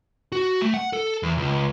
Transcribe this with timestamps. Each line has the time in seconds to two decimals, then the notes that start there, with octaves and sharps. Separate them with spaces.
0.32 F#4
0.62 A3
0.74 F#5
0.93 A4
1.23 E2
1.37 C#2